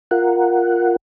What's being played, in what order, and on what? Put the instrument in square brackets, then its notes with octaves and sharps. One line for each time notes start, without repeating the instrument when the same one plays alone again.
[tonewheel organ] F4 A#4 F#5